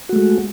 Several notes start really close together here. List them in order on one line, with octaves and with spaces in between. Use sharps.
F#4 A3 G#3